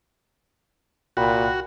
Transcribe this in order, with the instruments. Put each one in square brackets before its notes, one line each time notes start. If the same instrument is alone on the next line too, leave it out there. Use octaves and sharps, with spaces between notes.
[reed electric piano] C2 G5 B5 [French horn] A#2 [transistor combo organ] F#4